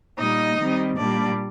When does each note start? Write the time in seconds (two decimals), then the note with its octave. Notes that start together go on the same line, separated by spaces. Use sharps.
0.18 A#2 G3 A#3 D#4 D#5
0.58 D#3 G3 C4
0.97 A#2 G3 A#3 D4 D5